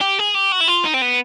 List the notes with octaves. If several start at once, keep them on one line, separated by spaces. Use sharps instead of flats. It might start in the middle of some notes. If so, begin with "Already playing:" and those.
G4
G#4
G4
F#4
E4
F4
D#4
C4
B3